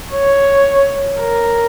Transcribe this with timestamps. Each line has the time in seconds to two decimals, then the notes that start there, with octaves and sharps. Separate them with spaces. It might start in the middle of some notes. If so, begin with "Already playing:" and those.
0.12 C#5
1.20 A#4